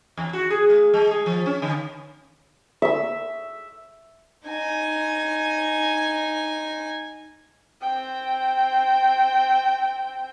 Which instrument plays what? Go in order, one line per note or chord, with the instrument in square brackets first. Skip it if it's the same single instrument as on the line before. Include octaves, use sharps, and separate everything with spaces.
[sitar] E2
F#4
G#4
A3
G#3
G#4
F3
C#4
D3
[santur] E5 E6
[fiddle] D#4 G#5
[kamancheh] C4 G5